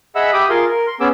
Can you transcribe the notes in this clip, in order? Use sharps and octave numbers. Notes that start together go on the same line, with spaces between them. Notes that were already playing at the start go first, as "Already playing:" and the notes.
G#4 D#5 E5 F#5 B5 E6
G4 E5 B5 D6 D#6
F4 G#4 A#4 F5 C6
A#4
C6
B3 C#4 G#4 D6 E6